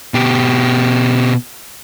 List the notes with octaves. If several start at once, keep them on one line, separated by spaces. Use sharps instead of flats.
B2 G4